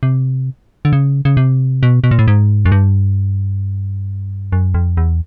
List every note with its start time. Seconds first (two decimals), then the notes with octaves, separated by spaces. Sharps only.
0.03 C3
0.85 D3
0.93 C#3
1.25 C#3
1.37 C3
1.83 B2
2.04 B2
2.11 A#2
2.19 A2
2.28 G#2
2.65 F#2
2.72 G2
4.52 F#2
4.74 F2
4.97 E2